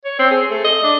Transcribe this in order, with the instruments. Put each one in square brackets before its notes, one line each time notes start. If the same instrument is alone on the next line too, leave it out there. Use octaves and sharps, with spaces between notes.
[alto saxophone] C#5
C4
G#4
A3
D#5
D4